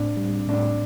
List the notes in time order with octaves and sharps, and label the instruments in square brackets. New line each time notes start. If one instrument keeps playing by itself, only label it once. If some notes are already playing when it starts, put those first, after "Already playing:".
Already playing: [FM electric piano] A2 C4 [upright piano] D4
[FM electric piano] G3
[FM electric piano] A2 [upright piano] D4